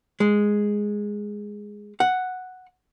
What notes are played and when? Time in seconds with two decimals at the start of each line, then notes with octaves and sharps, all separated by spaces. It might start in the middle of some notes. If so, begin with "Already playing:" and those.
0.20 G#3
2.00 F#5